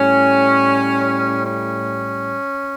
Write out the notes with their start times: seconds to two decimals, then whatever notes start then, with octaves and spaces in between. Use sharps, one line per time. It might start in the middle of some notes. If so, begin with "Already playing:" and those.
Already playing: A2 G3 C#4
1.44 C#4